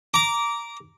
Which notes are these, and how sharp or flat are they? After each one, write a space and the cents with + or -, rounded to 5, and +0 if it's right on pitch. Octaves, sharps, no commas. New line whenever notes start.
A#5 +0 D6 -15